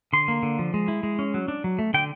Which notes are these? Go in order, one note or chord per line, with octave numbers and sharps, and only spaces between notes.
D3 C6
A#3
D3
F3
G#3
E4
G#3
C#4
F#3
D4
F#3
A3
D3 G5